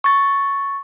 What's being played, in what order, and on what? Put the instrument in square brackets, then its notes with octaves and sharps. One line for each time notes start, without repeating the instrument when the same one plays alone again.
[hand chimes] C#6 A6